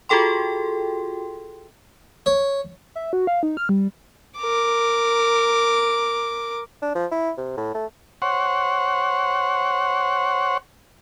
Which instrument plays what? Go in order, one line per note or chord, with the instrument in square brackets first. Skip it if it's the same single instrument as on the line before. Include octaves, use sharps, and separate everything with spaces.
[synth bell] F4 F#4 G#4 A4 G5 C6
[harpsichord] C#5
[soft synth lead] E5
F#4
F5
D#4
F6
G3
[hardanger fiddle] A#4 D6
[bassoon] D4
F3
E4
C3
A2
A3
[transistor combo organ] C5 C#5 F#5